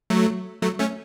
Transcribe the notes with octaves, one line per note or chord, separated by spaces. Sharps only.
F#3 A3
F#3 A3
A3 C#4